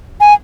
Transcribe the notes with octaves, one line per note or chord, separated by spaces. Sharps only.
G#5